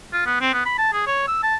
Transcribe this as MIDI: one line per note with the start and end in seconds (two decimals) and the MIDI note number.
0.13 0.25 65
0.26 0.39 59
0.41 0.51 60
0.53 0.65 59
0.66 0.78 83
0.78 0.90 81
0.93 1.04 68
1.07 1.27 73
1.28 1.43 88
1.43 1.56 81